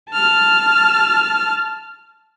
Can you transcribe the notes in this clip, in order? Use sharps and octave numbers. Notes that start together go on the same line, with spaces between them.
A5 F6